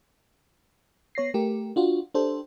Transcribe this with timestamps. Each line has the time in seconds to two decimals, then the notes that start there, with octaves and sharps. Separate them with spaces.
1.15 B3 C#5 A#6 C7
1.34 A3 G4 A#4
1.76 D4 F4 F#4
2.14 D4 G4 A4 C5